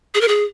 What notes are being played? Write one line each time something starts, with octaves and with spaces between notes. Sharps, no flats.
G#4
A#4
G#4